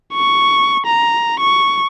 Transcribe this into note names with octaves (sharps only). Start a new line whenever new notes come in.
C#6
A#5
C#6